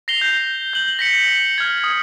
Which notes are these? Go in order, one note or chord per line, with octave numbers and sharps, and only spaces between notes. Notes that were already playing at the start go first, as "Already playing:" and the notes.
A#6 C7 F7 G7
G6
G6 F#7
A#6 B6 C#7
F6 G#6
D#6